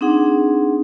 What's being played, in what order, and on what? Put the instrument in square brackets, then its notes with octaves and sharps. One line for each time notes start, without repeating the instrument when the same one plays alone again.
[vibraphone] C4 D4 D#4 G#4 F#5